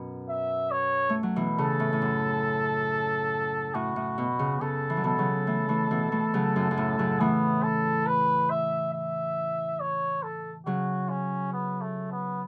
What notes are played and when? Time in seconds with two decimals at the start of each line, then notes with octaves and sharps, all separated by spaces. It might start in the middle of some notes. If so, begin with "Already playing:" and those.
Already playing: F#2 B2
0.29 E5
0.71 C#5
1.09 A3
1.23 F#3
1.36 B2 E3
1.58 C#3 A4
1.80 A2
1.93 A2
2.02 F#2
3.75 A2 F#4
3.96 A2
4.18 B2
4.39 C#3
4.61 C#3 A4
4.90 E3
4.97 F#3
5.04 B2 E3 A4
5.18 C#3 F#3
5.47 E3 A3
5.69 E3 A3
5.91 B2 E3
6.12 E3 A3
6.34 C#3 F#3
6.56 F#2
6.71 F#2
6.77 A2
6.99 C#3 F#3
7.20 E3 A3 B3
7.63 A4
8.06 B4
8.50 E5
8.94 E5
9.80 C#5
10.23 A4
10.66 C#3 F#3 F#4
11.09 C#4
11.53 B3
11.81 A3
12.11 B3